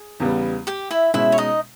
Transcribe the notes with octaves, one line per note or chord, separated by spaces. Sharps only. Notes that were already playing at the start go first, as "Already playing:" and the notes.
Already playing: G#4
E2 C#3 G3 B3
G4 G5
E4 E5
B2 G#3 C#4 E4 E5
C#5
D#4 D#5